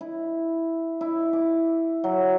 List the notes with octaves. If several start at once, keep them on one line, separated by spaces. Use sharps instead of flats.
E4
E4
D6
F#3